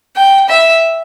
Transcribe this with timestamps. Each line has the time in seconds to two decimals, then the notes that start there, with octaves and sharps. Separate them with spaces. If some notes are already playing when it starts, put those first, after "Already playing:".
0.16 G5
0.49 E5